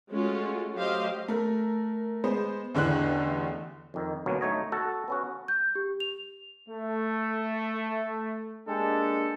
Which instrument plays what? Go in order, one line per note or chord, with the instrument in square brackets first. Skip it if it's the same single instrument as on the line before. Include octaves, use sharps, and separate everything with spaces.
[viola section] G#3 A3 C#4 F4 F#4
F#3 A3 G4 C5 D#5 F5
[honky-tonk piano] A3 A#4
G#3 B3 C5
A1 E2 D3 E3 F#6
[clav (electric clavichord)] F2 D#3
D2 B2 F#3 A#3 C#4
A3 D#4 C#5 D#5
F#4 A4
B3 C#4 F#4
[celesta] G6
G4
F7
[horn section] A3
G#3 A#3 D4 G4 A4